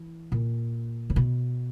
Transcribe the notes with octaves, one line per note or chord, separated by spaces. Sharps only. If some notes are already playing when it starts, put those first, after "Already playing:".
Already playing: E3
A#2
C#3
B2